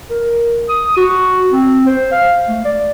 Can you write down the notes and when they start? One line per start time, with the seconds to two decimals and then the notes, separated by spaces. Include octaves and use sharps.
0.10 A#4
0.69 D#6
0.97 F#4
1.52 C4
1.86 C5
2.12 F5
2.48 A3
2.65 D5